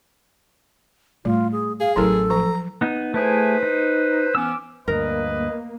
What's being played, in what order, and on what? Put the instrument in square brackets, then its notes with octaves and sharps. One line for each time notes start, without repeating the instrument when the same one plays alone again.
[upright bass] A2 [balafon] G3 [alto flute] F4
[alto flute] G#4
[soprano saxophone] G#4 [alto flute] F5
[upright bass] A1 F4 [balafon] F#3 E4 A#4 [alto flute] A4
[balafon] F3 [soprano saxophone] A#5
[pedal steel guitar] B3 D#4
[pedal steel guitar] A3 E4 G#4 [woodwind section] B4 C5
[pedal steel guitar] D#4
[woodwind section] E3 B3 C#4 [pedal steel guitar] D6 E6
[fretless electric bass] D2 G2 [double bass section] A#3 [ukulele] A#4 [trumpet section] B4 D#5